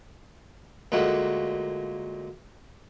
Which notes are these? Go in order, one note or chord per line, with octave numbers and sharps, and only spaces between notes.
D2 A#2 G#3 A3 F#5